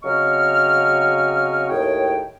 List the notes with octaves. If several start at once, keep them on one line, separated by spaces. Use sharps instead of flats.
C#3 F#3 C4 D#5 C#6 F6
D#2 A2 G#4 C#5 G5